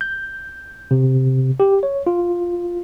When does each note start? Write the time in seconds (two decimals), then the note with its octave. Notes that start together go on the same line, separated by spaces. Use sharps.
0.01 G6
0.91 C3
1.60 G4
1.83 C#5
2.07 F4